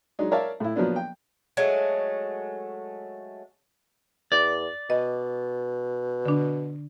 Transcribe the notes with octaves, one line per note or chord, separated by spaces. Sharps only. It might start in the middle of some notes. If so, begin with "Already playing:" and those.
F#3 G#3 D4 D#4
A#4 C#5 D5 E5 F5 A5
A2 E4
F3 F#3 A#3 B3 D4
G5
F#3 G#3 A3
E2 D5
B2 D#5
D3 D4